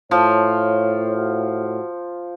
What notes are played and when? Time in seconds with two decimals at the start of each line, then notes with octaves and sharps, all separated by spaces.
0.11 A2 F3 C#5
1.16 F#4